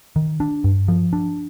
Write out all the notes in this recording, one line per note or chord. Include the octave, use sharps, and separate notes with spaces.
D#3
D4
G2
F3
D4